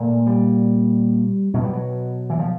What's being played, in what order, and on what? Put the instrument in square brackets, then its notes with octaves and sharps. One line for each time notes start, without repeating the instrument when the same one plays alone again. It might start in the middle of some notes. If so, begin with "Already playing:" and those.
Already playing: [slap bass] A#2 A3
G3
B2 F#3
G3
F#3
E3
F3